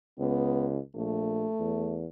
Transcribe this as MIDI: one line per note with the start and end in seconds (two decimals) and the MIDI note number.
0.19 0.78 37
0.19 0.70 59
0.96 1.47 34
0.96 2.02 57
1.60 2.07 40